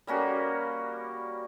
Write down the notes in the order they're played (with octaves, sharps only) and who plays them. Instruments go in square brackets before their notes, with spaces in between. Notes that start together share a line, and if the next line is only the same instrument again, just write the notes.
[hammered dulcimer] G3 A#3 C#4 F#4